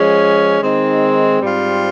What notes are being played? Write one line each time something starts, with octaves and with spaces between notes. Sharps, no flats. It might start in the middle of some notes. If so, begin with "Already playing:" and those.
Already playing: F3 G#3 C#4
D#3 G#3 C4 D#4
G#2 G3 C4 F4